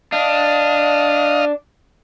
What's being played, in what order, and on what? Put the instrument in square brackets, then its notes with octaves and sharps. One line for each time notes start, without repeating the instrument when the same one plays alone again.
[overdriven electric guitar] D4 [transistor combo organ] D#5 F5